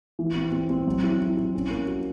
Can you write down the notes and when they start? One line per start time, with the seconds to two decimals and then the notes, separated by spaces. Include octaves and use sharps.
0.19 E3
0.35 C4
0.52 C4
0.69 C4
0.87 F#3
1.04 E4
1.21 E4
1.37 E4
1.55 C#4
1.71 A#3
1.87 F#4